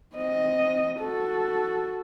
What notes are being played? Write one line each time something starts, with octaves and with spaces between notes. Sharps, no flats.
C4 D#5
F#4 A4